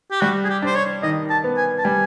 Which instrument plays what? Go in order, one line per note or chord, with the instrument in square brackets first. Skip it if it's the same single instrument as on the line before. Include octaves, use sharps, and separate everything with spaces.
[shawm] G4
[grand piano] G3 [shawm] F#4
[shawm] G#4
G4
[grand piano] D4 [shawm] C5
[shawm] C#5
[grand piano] D#3 [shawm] D#5
[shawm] A5
[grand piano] B3
[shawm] G#5
A5
[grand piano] G3 [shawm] G#5